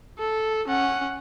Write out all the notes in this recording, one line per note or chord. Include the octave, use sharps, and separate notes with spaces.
A4
C#4 F#5